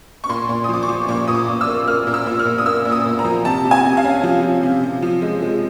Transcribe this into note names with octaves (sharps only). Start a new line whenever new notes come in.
C#6
A#2 C6
A#2
D#6
F3 D6
C#6
F3
A#2 C#6
A#2 D#6
D6
A#2
E6
A#3
A#3 F6
A#2
E6
A#2
F6
A#2
D#6
A#3 E6
A#2
D#6
A#2
A#5
F3
C3 A5
C3
G#5
C3
F5
C#4
F3
F3
C3
C3
F3
G#3
G#3